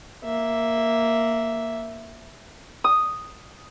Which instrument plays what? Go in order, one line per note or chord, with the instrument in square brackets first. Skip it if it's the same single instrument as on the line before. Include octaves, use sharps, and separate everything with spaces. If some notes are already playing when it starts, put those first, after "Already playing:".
[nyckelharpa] A#3 E5
[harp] D#6